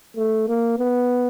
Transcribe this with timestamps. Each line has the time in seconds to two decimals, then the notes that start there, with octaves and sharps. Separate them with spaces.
0.17 A3
0.48 A#3
0.78 B3